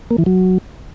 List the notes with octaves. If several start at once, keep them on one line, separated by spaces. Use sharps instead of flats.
A#3
E3
F#3